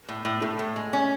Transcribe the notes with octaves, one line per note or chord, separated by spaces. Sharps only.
A2
A2
A2 A3
A2
G#3
C#4